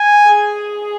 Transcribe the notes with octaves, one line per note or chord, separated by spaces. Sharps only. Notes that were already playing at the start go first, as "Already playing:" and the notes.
Already playing: G#5
G#4